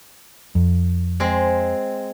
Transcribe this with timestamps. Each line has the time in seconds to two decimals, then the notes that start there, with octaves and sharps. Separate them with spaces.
0.55 F2
1.20 G#3 C4